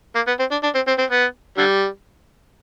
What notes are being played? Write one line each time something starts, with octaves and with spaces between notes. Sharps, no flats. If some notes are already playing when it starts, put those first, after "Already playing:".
A#3
B3
C4
D4
D4
C4
C4
C4
B3
D3 G3